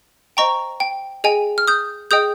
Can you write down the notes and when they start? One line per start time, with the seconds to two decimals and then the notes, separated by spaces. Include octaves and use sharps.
0.37 C5 D#5 G5 A#5 C#6
0.80 G5
1.24 G#4 D#5 G5 G#5
1.58 F6
1.68 D#6 G6
2.11 G#4 D#5 G5 D#6 G6